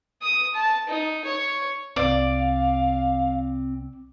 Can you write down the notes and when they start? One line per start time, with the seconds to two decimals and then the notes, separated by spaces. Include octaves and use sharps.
0.22 D#6
0.54 A5
0.88 D#4
1.25 C#5
1.96 C2 C4 D5 F5